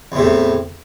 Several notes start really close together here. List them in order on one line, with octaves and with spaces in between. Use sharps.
E2 C3 A2